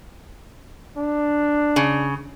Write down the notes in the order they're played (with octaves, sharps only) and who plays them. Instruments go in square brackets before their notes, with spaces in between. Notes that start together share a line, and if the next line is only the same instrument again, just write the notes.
[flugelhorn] D4
[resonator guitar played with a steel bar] C#3